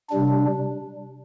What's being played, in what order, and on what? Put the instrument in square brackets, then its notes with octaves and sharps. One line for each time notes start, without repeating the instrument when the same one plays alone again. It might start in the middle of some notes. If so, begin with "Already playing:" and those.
[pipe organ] C3 G3 D4